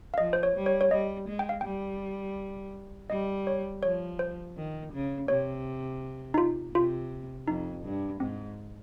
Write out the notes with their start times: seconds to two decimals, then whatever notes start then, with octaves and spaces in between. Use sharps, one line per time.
0.14 F5
0.18 F3 D#5
0.33 C5
0.43 C#5
0.55 G3
0.66 C#5
0.81 C#5
0.91 G3 D#5
1.28 G#3
1.39 G5
1.49 F5
1.61 G3 G5
3.10 G3 D#5
3.47 C#5
3.83 F3 C#5
4.19 C5
4.56 D#3
4.92 C#3
5.28 C3 C#5
6.34 D#4
6.38 F4
6.74 C3 F4
7.47 F2 D#4
7.84 G2
8.20 G#2 C4